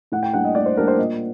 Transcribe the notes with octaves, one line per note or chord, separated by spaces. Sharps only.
A2 F#5
G5
G3 A#3 D4 F#5
D#5
A2 D5
C5
G3 A#3 D4 A#4
C5
A#2 D#5